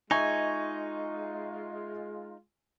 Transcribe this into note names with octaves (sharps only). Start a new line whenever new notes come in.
G#3 D#4 F4 D#5 E5 G#5 C#6